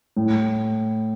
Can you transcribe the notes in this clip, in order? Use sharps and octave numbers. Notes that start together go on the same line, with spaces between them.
A2